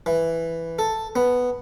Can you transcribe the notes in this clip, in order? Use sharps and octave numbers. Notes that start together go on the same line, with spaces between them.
E3
A4
B3